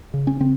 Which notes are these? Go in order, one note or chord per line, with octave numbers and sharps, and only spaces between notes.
C#3
C#4
C#3 C4